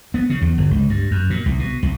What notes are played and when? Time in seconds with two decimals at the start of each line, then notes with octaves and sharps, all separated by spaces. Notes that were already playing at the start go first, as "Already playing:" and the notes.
0.14 B3
0.30 C#3
0.41 E2
0.58 G1
0.71 C#2
0.90 G2
1.11 F#2
1.30 A#2
1.46 C2
1.59 B2
1.83 C2